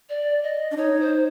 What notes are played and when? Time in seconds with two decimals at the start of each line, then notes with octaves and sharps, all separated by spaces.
0.09 D5
0.43 D#5
0.71 D4
0.77 D#4 C#5
1.00 C5